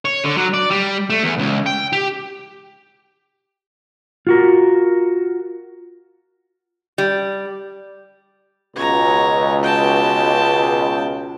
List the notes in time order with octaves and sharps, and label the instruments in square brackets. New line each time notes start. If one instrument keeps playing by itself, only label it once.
[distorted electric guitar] C#5
D3
F#3
D5
G3
A3
E2
C#2
G5
G4
[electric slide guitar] F4 F#4 A#4
[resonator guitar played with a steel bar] G3
[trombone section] C#2 B2 [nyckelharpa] C#5 A#5
[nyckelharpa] G5 A5